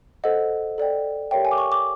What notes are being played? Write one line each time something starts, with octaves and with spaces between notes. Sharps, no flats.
A4 C5 D#5 F#5
A4 D5 G5
G4 A#4 C#5 E5 G5
G#5
D6
C#6
D6